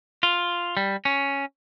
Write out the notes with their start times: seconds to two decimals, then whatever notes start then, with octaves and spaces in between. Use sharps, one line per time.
0.23 F4
0.77 G3
1.05 C#4